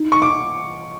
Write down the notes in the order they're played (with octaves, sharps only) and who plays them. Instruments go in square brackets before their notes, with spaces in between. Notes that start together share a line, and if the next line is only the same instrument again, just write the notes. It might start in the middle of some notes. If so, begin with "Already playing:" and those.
Already playing: [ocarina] D#4
[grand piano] C#6
D6